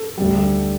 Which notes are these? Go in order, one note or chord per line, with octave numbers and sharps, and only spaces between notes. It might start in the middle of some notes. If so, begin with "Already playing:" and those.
Already playing: A4
D2 D3 G3